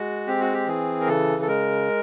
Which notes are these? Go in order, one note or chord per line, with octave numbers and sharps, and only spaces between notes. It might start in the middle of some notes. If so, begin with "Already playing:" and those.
Already playing: G#3 F#4
C4 G4
F#4
G4
E3 G#4
A#4
C#3 A4
A4
G#3 A#4